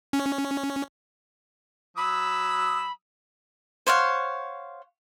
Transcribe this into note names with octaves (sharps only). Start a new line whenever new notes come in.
C#4
F#3 B5 D#6 E6
C5 C#5 F5 F#5